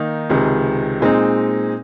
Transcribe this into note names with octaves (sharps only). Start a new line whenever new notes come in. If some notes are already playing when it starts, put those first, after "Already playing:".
Already playing: D#3 A#3 D#4
C#2 C3 D#3 G#3
A#2 G#3 C4 D#4